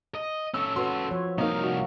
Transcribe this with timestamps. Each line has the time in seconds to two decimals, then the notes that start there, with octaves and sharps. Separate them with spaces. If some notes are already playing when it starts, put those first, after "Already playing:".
0.15 D#5
0.54 C#4 A4 E6
0.76 F#4 B4 C6
1.11 F3 C#5
1.38 C2 A#3 D#4 A#4 F5
1.63 F#4